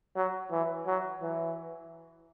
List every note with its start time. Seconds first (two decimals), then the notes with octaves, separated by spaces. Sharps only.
0.16 F#3
0.51 E3
0.87 F#3
1.22 E3